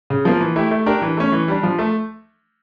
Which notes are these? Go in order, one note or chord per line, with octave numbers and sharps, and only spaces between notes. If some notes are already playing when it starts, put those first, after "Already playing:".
C#3
F3 A#3
E3
A3 E4 G4
A3
D4 G4 A#4
E3
A3 C#4
E3
G3 D4
F3
A3